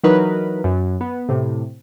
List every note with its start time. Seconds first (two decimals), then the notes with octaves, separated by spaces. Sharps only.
0.04 E3 F#3 D#4 A#4 B4
0.64 F#2
1.01 B3
1.29 A2 C3